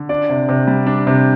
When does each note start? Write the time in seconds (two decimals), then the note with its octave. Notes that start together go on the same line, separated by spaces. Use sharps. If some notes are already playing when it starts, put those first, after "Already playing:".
Already playing: D3
0.09 D4 D5
0.30 C3
0.49 C3
0.67 G3
0.86 D4
1.07 C3